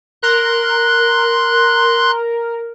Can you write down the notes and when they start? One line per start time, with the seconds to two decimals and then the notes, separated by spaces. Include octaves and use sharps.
0.23 A#4 C6 F#6